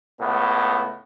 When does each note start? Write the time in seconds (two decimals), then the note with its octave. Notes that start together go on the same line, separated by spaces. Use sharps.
0.21 C#2 A2 B3